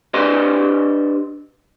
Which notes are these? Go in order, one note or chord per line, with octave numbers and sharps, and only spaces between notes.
D4 G4 B4 C5 D5 D#5